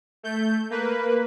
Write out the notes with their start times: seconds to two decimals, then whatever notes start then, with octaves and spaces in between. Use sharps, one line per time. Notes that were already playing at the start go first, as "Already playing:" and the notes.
0.23 A3 G6
0.70 A#3 B4